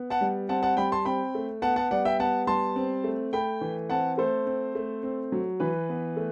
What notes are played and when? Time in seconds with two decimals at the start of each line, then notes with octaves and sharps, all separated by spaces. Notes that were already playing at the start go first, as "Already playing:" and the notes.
Already playing: B3
0.10 F#5 A5
0.21 G3
0.49 C4 F#5 A5
0.63 F#5 A5
0.77 G3 G5 B5
0.92 A5 C6
1.05 C4 G5 B5
1.35 A3
1.62 B3 F#5 A5
1.76 F#5 A5
1.91 G3 D5 F#5
2.05 E5 G5
2.20 B3 F#5 A5
2.47 G3 A5 C6
2.76 C4
3.04 A3
3.33 A3 G5 B5
3.61 E3
3.90 C4 F#5 A5
4.18 A3 A4 C5
4.46 C4
4.75 A3
5.03 C4
5.32 F#3
5.60 E3 B4
5.89 B3
6.17 A3